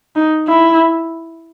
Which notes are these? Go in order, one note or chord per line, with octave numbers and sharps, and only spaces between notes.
D#4
E4